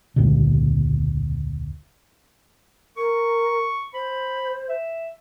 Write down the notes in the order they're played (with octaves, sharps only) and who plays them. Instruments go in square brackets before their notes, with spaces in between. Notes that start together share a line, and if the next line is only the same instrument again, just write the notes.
[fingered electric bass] E1 C#2 A#2 D3
[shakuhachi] A#4 [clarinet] C#6
[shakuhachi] C5 [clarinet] B5
[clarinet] E5